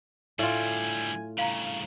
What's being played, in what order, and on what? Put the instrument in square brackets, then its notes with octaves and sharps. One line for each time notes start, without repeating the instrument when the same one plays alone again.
[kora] A2 F4 [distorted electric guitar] D3 G3 [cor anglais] G#5
[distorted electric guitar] G2 C#3 [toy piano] F5 A#5